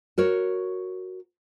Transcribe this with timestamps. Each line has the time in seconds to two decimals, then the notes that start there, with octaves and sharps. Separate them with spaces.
0.18 F#4 A#4 C#5